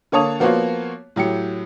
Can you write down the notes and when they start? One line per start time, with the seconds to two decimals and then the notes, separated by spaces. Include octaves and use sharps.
0.12 D3 A#3 C#5 A5 D#6 F7
0.40 F3 A#3 B3 F4 F#4 C#5
1.16 A2 F#3 G4 C#7